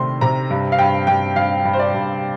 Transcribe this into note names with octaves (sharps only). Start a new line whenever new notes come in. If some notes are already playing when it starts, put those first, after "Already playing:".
Already playing: C3 D#3 A3 D4 C6
C3 A#5
G2
F5
G2 G5
G2 G5
G2 F5
G2
C5
D5
G2